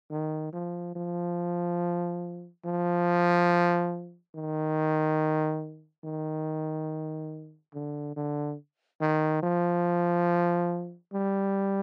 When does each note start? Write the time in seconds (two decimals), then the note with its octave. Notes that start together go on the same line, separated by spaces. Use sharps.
0.11 D#3
0.53 F3
0.95 F3
2.65 F3
4.35 D#3
6.04 D#3
7.74 D3
8.16 D3
9.01 D#3
9.43 F3
11.13 G3